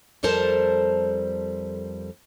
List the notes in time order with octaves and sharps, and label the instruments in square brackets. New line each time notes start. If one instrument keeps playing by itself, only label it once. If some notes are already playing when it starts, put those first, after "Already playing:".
[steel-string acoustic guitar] F2 G3 A4 A#4 C5 A5